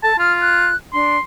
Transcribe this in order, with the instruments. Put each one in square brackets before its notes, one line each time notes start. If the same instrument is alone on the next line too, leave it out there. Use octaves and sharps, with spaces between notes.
[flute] A4 [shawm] A5
[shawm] F4 [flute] F6
[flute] F#6
[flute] D4 [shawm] C6